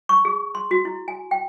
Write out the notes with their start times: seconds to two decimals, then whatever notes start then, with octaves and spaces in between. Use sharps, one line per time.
0.09 C#6
0.25 G#4
0.55 C6
0.71 F#4
0.85 E4
1.08 G#5
1.31 G5